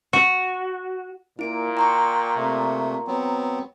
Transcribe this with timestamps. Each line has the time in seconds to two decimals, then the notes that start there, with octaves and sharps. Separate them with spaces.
0.13 F#4
1.39 A#2 A#3 E4 D7
1.77 G5 A#5 C6 C#6
2.36 C3 A3
3.07 F#3 B3 C4